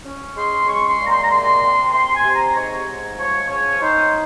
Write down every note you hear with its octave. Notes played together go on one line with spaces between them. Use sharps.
C#4
G#3 C6
G#3 C#6
C6
A#2
A#5
C6
A#5
C3 C6
C3
C3 C6
G#5
C3
A#5
G#2 C#5
G#2
F3 C#5
C#4 C#5
D#4 C5